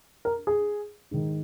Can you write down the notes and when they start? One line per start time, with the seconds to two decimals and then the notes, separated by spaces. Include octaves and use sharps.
0.25 A#4
0.47 G#4
1.11 G#2 D#3